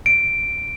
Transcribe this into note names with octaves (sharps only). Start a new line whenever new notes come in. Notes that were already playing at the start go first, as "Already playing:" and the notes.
D7